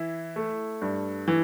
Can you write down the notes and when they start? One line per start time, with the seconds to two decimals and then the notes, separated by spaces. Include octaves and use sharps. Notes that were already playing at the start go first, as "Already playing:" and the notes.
Already playing: E3 E4
0.36 A3
0.82 G2
1.28 E3